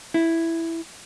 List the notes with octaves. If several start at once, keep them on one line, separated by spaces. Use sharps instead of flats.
E4